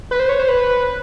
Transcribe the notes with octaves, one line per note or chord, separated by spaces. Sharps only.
B4
C5
C#5
C5
B4